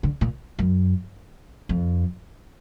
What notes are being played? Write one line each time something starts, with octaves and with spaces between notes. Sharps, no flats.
D3
A#2
F#2
F2